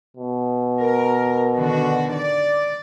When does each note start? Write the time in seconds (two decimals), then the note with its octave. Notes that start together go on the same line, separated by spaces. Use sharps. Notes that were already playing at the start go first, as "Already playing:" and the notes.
0.17 B2
0.80 A#4
1.56 D3 D#3 F#4
2.13 D5